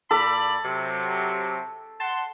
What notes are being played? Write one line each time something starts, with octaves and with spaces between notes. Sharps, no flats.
A#2 A4 D5 B5
C3 F#3
F#5 A5 C6